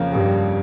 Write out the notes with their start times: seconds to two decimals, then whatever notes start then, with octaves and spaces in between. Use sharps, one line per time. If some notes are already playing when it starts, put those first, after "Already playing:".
Already playing: F2 C#3 F3 A#3
0.12 G2